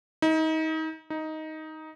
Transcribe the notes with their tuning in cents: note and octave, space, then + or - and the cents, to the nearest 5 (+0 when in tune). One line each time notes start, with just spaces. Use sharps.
D#4 +30
D#4 +10